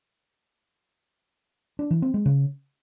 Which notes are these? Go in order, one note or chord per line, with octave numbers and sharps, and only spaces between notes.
D4
E3
C4
G#3
C#3